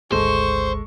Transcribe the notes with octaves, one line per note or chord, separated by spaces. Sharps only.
G#1 D2 G#3 A4 C5 C#6